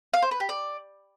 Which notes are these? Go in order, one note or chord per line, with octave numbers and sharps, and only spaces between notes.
F5
C5
B4
G4
D5